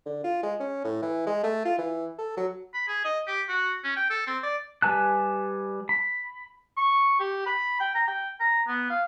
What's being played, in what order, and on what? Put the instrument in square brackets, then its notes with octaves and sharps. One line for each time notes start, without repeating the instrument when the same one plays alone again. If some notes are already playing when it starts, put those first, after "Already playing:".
[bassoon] D3
F4
G#3
C#4
A2
E3
G#3
A3
F4
E3
A4
F#3
[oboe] B5
G#4
D#5
G4
F#4
C#4
G5
A4
C4
D5
[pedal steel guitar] G3 B4 G#5 A5 F#6
B5
[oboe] C#6
G4
B5
G5
A#5
G5
A#5
B3
F5